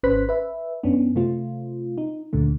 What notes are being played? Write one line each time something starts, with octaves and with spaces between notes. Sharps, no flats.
G#1 C#4 B4 C5 F#6 B6
B4 E5
F#2 B3 C#4 D4
C3 A3 C4 F4
D#4
D2 A#2 D3 A3